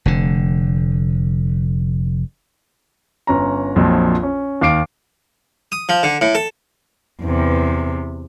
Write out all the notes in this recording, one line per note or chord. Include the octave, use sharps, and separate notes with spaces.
F1 D3
G1 C#4 A#5
A#1 F2 A#2 F#3
C#4
D#2 F5 D6 C7 D7
D#6
F3
D3
A2
A4
E2 C3